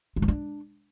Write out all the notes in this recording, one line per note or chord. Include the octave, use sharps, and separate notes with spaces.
G#3
B3
D4